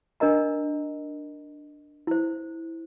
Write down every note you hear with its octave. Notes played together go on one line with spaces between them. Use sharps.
D4 A#4 D#5 A#5
E4 C5